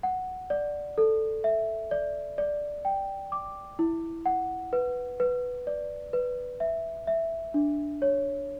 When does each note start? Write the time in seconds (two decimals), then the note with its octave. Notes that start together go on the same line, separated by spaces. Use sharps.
0.03 F#5
0.50 D5
0.98 A4
1.44 E5
1.91 D5
2.38 D5
2.85 G5
3.32 D6
3.79 E4
4.26 F#5
4.73 B4
5.20 B4
5.67 D5
6.13 B4
6.60 E5
7.07 E5
7.54 D4
8.02 C#5